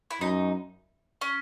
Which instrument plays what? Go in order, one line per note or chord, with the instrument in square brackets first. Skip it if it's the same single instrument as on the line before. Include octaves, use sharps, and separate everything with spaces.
[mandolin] E4
[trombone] F#2 [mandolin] D#4
[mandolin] C#4